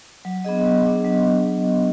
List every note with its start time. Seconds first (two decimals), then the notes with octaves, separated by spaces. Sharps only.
0.25 F#3
0.45 B3 D4 G#4 D#5
0.65 F#3
0.85 B3 D4 G#4 D#5
1.05 F#3